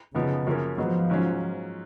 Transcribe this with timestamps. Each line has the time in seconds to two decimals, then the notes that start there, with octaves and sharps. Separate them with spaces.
0.15 F#2 C#3 F3 B3 D#4
0.47 F#2 F3 A#3 C#4
0.77 G#2 F3 F#3 B3 D#4
1.10 G#2 F#3 C#4